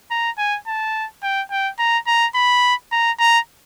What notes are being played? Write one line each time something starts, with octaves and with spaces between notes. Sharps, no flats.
A#5
G#5
A5
G5
G5
A#5
A#5
B5
A#5
A#5